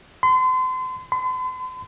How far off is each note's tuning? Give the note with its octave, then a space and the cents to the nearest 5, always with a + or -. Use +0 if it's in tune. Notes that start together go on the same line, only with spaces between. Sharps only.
C6 -35
C6 -45